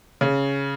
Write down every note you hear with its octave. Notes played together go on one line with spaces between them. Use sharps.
C#3